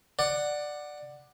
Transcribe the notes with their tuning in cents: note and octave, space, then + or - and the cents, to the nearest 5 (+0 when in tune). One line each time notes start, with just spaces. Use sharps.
D5 +15 F#5 +0